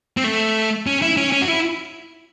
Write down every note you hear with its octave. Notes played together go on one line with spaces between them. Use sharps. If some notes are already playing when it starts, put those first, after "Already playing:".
C4
A3
C#4
E4
C#4
C#4
F#4
E4